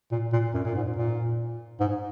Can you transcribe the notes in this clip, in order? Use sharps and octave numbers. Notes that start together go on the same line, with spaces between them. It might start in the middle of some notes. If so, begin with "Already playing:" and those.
A#2
A#2
F#2
A#2
G#2
A#2
G#2